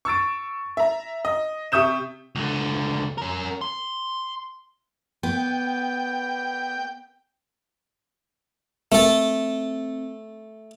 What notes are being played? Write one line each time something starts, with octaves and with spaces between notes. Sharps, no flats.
C#6 E6 A6 D7
E5 A#5
D#5
C3 E5 C#6 D#6 G6 E7
C#2 D3
C#4 A#4
C6
B3 G5
A3 C4 A4